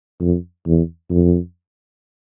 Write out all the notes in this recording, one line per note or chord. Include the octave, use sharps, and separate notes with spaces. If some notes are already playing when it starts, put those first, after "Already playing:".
F2
E2
F2